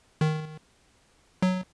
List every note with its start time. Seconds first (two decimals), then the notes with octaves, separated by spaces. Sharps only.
0.21 D#3
1.42 F#3